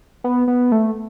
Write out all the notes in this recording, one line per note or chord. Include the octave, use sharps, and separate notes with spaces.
B3
B3
A3